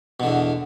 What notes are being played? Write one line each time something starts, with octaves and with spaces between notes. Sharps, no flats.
E2 B2 D3